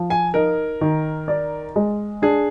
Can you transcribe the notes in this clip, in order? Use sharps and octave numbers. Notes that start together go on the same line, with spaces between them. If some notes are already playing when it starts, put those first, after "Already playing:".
Already playing: F3
G#5
D#4 A#4
D#3
D5
G#3
D4 G#4